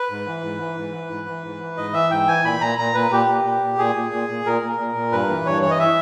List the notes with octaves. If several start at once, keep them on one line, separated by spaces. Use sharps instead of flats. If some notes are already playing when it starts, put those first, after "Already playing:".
Already playing: B4
G#2
E3
G#2
E3
G#2
E3
G#2
E3
G#2
E3
G#2 D#5
E3 E5
G#2 G5
E3 G#5
A#2 B5
A#2 A#5
A#2 A#5
A#2 B4
A#2 G4
A#2
A#2
A#2
A#2 G#4
A#2
A#2
A#2
A#2 A#4
A#2
A#2
A#2
G2 B4
E3
G2 C#5
E3 C#5
D#5
E5